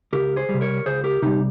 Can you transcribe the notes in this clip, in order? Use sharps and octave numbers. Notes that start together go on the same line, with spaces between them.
C#2 G4 A#4
G#4 C5
G3
C3
A#4 C#5
C#2 G#4 C5
G4 A#4
C3 G3 D#4 G4